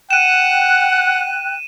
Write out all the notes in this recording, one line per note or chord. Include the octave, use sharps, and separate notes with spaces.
F#5 G5 F#6 D#7 E7